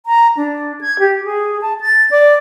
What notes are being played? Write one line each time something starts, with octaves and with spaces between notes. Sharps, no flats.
A#5
D4
G#6
G4
G#4
A5
A6
D5